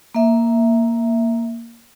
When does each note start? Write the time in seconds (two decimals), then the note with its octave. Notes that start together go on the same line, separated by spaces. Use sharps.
0.15 A#3 E5